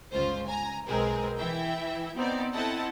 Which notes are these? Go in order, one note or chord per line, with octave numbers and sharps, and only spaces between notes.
G1 C#2 F4 C5
G#5 A#5
B1 G#3 C4 G#4 A#4 B4
E3 E4 E5 G5
B3 C4 D#4 D5
C4 E4 A4 D#5 F#5 A5